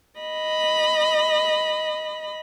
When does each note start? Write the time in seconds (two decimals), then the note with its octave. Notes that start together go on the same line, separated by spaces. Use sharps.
0.20 D#5 B5